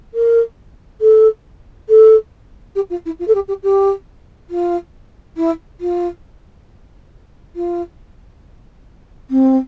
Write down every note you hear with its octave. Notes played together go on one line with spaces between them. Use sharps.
A#4
A4
A4
G4
F4
E4
F4
A4
G4
G4
G4
F4
E4
F4
F4
C4